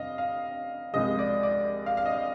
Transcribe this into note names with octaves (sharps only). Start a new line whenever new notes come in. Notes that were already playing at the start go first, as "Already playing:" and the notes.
Already playing: F2 C3 G3 D#5 F5
F5
C2 C3 F3 G#3 D#5
D5
D5
F5
F5
D#5